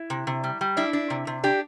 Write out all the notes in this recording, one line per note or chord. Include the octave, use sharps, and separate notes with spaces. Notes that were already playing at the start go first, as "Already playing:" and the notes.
Already playing: E4
C3
C3
G3
G3
D4 E4
D4
C3
C3
D4 G4